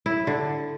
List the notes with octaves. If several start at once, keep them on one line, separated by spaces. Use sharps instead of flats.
E4
D3